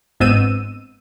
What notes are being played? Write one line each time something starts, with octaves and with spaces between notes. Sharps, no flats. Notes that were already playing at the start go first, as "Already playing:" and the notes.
G1 G#2 B3 C4 E6 D#7